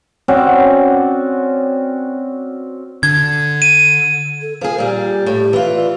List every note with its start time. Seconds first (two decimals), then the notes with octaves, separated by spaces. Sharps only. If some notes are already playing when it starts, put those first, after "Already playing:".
0.28 C4 C#4 F#4 D5
3.03 D3 G#6
3.62 D#7
4.41 A4
4.61 F3 G#4 A#4
4.78 A#2 G3 G4
5.26 A2 G4
5.53 E3 F4
5.75 D5